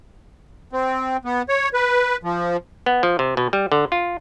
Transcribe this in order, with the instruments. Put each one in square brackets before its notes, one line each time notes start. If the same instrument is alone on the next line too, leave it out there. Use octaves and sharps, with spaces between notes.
[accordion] C4
B3
C#5
B4
F3
[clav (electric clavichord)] B3
F3
C3
B2
G3
D3
F4